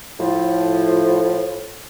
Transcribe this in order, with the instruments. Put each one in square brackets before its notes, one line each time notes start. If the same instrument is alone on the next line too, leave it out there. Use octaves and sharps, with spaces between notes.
[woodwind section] A2 F3